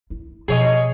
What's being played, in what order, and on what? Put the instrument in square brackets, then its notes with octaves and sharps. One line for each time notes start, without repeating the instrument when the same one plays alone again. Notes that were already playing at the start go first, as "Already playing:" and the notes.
[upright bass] E4
[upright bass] B2 F3 [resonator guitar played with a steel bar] G#4 C#5 D#5